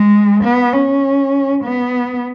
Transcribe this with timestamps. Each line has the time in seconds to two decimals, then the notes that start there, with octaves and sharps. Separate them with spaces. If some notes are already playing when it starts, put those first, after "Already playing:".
Already playing: G#3
0.43 B3
0.73 C#4
1.64 B3